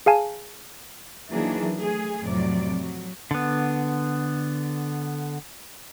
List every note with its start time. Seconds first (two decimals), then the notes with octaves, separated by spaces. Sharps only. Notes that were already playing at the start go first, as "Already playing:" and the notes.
0.06 G#4 F5 G#5 A5
1.31 D#3 E3 F#3 A#3 D4 G#4
1.76 A3 G#4
2.22 F2 A2 C3 F#3 D5
2.79 F#3
3.31 D3 B3